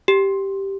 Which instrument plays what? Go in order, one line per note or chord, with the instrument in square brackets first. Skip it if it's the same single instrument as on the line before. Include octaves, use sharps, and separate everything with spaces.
[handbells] G4